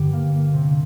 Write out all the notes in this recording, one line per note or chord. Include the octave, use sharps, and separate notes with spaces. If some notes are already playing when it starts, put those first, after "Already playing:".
Already playing: G2 D3 G4
A#3
A#3
C3